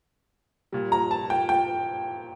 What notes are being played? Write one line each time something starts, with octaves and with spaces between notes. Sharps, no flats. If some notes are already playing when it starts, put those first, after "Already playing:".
A#2 G3
A#5
A5
G5
G5